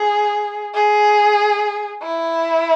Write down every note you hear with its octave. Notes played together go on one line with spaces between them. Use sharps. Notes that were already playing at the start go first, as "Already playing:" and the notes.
Already playing: G#4
G#4
E4